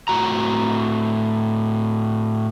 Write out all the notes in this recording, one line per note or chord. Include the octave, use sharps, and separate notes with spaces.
A2 F#4 A#5